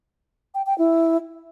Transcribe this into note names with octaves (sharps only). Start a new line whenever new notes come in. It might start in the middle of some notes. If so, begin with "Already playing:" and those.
G5
G5
E4